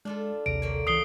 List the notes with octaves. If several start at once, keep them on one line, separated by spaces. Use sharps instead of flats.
G#3 D4 F4 A4
A#1 D#2 C3 A#5 D7
D3 A#3 C#5
C#2 C#3 E3 D#6 C7 G7